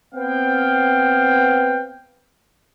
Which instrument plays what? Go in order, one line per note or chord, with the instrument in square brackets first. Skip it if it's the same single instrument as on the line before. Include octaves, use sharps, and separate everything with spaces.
[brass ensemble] B3 C4 F5 G5